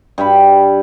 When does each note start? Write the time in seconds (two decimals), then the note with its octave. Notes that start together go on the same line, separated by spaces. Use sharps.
0.18 G2 B5